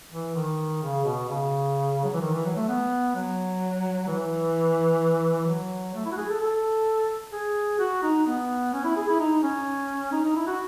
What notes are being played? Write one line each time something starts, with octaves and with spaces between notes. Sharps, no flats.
E3
D#3
C#3
B2
C#3
F#3
E3
D#3
E3
F#3
A3
B3
F#3
E3
F#3
A3
E4
F#4
G#4
A4
A4
G#4
F#4
D#4
B3
C#4
E4
G#4
E4
D#4
C#4
D#4
D#4
E4
F#4